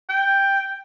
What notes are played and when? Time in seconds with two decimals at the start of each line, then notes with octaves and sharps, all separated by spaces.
0.09 G5